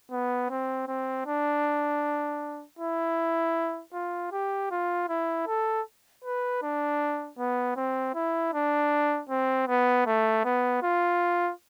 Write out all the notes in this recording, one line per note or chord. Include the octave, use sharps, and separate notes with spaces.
B3
C4
C4
D4
E4
F4
G4
F4
E4
A4
B4
D4
B3
C4
E4
D4
C4
B3
A3
B3
F4